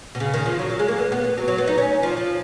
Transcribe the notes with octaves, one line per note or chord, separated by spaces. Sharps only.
B2
C#3
D#3
F3
F#3
F#3
G#3
A#3
B3
B3
B3
F#3
F#3
B3
D#4
C#4
F3
F3